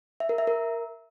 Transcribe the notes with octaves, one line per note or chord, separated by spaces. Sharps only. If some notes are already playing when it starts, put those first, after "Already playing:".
E5
A#4
E5
A#4